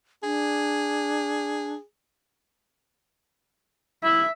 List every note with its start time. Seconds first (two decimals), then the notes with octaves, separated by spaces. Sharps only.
0.23 D4 G#4
4.04 E4 E5